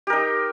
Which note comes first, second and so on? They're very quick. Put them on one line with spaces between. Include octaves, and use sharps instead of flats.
G4 A#4 D#4